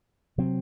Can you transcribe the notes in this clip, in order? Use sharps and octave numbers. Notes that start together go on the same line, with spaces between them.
C3 F#3 C4